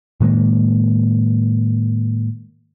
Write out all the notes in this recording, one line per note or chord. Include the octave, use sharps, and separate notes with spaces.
A2 D#3 G#3 A#3